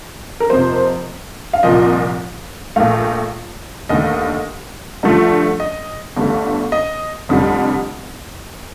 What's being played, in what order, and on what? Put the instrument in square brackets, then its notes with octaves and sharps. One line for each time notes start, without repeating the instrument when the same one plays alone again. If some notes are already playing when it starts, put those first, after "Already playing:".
[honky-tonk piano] A#4
F2 C3 F3 A#3 C5
F5
C2 A#2 F3 D#5
A#1 A#2 A3 F5
D#2 D3 A3 D#5
G2 D3 F3 A3
D#5
G1 G2 D3 A3
D#5
F1 F2 D3 G3